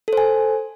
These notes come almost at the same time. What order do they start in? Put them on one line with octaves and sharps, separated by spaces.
A4 C5 G#5